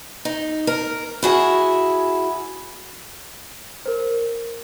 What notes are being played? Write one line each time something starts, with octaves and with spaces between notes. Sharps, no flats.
D#4
A#4
E4 F#4 G#4
A#4 C5